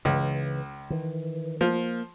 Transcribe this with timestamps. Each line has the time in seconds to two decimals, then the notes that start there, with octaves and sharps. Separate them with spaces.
0.05 C#2 C#3 E3
0.90 D#3 E3
1.61 F3 A#3